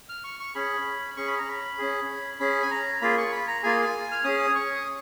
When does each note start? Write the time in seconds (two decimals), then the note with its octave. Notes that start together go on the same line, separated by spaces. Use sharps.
0.09 F6
0.24 C#6
0.40 C#6
0.55 C#4 G#4 B5
1.17 C#4 G#4 C#6
1.27 B5
1.38 A#5
1.48 B5
1.78 C#4 G#4
2.40 C#4 G#4 B5
2.62 G#5
2.71 A#5
3.02 A#3 F4 G#4 B5
3.18 C#6
3.32 B5
3.48 A#5
3.63 A#3 F4 G#4 G#5
4.12 F6
4.24 C#4 G#4 D#6
4.55 C#6
4.76 D#6